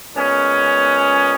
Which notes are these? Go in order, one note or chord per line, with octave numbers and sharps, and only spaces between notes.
A#2 G#3 B3 C#4